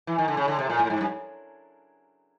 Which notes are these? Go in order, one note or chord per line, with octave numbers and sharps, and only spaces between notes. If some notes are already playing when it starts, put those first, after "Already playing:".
E3
D#3
D3
C#3
D3
C3
A#2
A2
G#2
G2